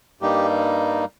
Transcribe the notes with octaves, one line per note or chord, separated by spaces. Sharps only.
G2 G3 A#3 D#4 G4